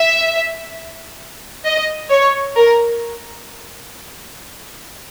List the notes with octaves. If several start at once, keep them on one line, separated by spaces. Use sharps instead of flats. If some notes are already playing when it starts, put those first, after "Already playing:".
Already playing: E5
D#5
C#5
A#4